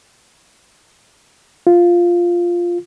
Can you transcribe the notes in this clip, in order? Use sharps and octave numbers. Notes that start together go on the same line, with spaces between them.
F4